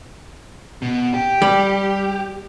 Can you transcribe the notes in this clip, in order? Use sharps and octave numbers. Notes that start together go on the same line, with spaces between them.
B2
G4
G3